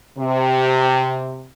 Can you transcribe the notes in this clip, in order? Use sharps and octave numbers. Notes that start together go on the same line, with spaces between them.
C3